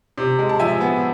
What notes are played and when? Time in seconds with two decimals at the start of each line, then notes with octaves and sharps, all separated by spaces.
0.18 C3
0.39 G#3
0.49 A5
0.60 F3 E5 G#5
0.81 B3